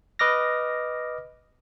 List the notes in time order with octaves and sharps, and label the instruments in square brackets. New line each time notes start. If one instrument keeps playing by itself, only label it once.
[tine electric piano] B4 D#5 D6 F6 A#6